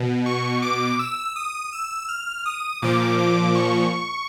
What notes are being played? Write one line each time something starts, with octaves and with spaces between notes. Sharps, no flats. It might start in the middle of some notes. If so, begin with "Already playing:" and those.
Already playing: B2
C#6
D6
E6
D#6
E6
F6
D#6
A#2 F3 D6
D6
C#6